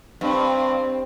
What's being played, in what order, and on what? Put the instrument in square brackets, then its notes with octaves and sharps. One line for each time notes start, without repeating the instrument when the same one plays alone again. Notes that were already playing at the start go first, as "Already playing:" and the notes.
[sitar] G2 [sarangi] C4